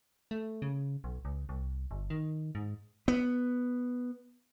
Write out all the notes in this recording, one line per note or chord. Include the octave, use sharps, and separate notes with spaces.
A3
C#3
B1
C#2
C2
G1
D#3
G#2
B3